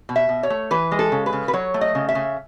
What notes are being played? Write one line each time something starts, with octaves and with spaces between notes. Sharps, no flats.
B2
E5
B2
C#5
A3
E3 B4
G#3
A4
C#3
B4
C#3
B4
F#3 C#5
A3
D#5
C#3
E5
C#3